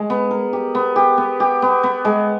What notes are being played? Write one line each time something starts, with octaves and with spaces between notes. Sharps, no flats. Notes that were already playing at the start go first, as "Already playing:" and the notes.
Already playing: G#3
B3
A#4
G4
B3
G4
B3
G4
B3
B3
G#3